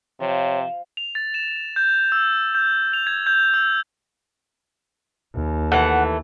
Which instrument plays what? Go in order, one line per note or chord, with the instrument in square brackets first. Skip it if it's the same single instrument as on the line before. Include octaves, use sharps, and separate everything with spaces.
[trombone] C3 [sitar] F3 [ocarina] C#5
[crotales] F7
A6
E7
G6
E6
G6
F7
G#6
G6
E6
[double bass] D#2
[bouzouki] E3 A3 [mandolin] F#5